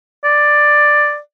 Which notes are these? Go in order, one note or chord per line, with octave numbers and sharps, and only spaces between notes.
D5